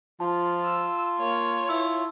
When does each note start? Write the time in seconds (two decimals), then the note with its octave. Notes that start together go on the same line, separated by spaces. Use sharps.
0.20 F3 F4 A5
0.64 E6
1.19 A#3 C#5
1.69 E4 E6